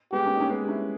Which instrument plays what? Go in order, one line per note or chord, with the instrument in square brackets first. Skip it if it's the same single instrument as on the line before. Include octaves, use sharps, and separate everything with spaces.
[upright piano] G#3 B3 [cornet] G4
[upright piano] A#3 C#4
D#4
A#3 C#4
G#3 B3
G4
C#4 E4